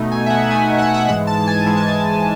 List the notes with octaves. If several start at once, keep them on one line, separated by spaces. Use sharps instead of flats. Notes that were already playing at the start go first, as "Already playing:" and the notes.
Already playing: B2 A3 D#4
G#5
E5
F#5
B2 A3 D#4 G#5
G#5
F#5
E5
G#2 E3 G#3 F#5
A5
G#5
G#2 E3 G#3 G#5
A5
G#5